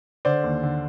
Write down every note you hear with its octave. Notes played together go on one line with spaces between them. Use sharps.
D3 C5 D5
D#2
D3